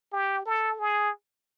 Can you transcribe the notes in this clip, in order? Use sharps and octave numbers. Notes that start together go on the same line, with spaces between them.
G4
A4
G#4